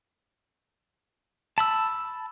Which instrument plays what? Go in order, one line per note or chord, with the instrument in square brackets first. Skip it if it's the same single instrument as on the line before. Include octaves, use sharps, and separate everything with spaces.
[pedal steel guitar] A5 B5 E6